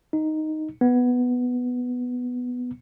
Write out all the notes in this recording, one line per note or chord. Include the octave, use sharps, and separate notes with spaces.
D#4
B3